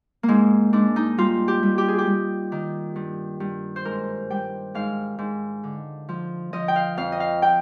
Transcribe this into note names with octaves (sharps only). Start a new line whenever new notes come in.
A#3
G#2 G#3
G#2 D4
D#4
G3 F4
G4
G3
G4
G#4
G4
G3
D#3
G2
G2
C5
G#2 A#4
G3 G5
G#2 F5
G#2
D3
F3
F3 D#5
G5
F5
F2 F5
D#5
F5
G5